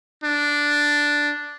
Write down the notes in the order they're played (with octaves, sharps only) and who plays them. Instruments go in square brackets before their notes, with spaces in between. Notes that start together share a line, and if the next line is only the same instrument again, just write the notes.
[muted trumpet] D4